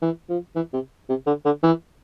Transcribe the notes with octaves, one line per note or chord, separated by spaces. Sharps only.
E3
F3
E3
C3
C3
D3
D3
E3